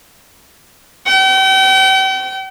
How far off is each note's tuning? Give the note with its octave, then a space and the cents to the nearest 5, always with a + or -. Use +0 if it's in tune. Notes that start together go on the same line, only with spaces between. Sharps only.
G5 -40